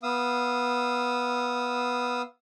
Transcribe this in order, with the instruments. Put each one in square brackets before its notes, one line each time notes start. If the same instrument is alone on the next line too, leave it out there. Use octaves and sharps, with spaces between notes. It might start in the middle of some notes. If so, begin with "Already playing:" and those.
[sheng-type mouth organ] B3 F5 D#6 E6